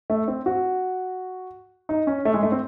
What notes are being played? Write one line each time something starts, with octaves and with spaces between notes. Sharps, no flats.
A3
C4
F#4
D#4
C#4
A3
G#3
A3
C4